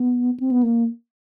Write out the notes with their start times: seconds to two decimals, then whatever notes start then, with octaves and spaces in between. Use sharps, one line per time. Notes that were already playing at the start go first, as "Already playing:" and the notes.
Already playing: B3
0.40 C4
0.51 B3
0.63 A#3